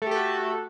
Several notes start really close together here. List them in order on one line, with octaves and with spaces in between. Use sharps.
A3 G4 A4 F#4